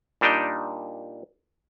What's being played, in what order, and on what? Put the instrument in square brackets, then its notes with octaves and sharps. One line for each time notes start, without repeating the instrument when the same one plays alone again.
[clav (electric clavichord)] A#2 G3 D4 D#4 G5